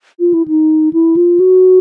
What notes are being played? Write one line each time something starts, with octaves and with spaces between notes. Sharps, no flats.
F4
E4
D#4
E4
F4
F#4